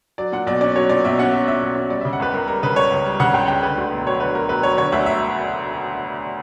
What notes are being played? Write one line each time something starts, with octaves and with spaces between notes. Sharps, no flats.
F#3 D5
A#2 F#5
B1 D5
C#4 D5
F#3 C#5
A#2 D5
B1 E5
C#4 F#5
F#3 E5
A#2 E5
B1
C#4
G3 D5
C#3 E5
F#5
C#2 B4
C#2 A#4
G3 A#4
C#3 B4
C#2 C#5
C#2
G3
C#3 F#5
C#2 G5
C#2 G5
D3 B4
D2
E1
F#3 C#5
D3 B4
D2 A#4
E1 B4
F#3 C#5
D3 C#5
D2 E5
E5